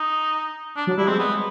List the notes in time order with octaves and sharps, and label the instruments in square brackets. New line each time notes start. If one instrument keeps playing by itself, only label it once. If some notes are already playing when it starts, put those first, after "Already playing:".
Already playing: [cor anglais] D#4
D4
[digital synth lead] F#3
[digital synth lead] G3 [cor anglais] E4
[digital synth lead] G#3 [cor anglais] C4
[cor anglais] B3